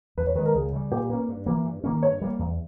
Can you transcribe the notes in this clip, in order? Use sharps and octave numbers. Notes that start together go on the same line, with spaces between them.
E2 B4
C#5
D#3 G#3 B4
A#4
C#2 G#4
C#3 G3
A#2 G4
A#3 C#4 B4
G2
E3 A#3
G2
D#3 A#3 C#4
G2 C#5
G3 A#3
E2